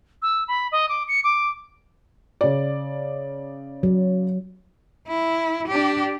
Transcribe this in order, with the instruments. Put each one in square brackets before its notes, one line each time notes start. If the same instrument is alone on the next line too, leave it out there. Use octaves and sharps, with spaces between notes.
[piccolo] E6
B5
D#5
D6
C#7
D6
[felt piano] C#3 D5
[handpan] F#3
[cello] E4
D4 G4